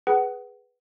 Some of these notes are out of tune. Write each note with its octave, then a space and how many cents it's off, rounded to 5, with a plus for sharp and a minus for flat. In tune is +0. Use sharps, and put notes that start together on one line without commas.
G#4 +0 B4 +0 F#5 +30